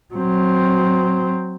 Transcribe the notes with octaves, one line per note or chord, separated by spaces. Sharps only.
F#3 C4